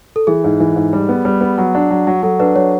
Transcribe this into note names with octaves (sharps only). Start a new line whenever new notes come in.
A4
E3 G#4
G#2
E3
G#2
G3
B3
G3
B3
F#3
D4
F#3
F#3
F#3 A4
D4 B4
F#3 C#5